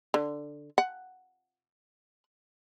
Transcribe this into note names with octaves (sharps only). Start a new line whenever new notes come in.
D3
F#5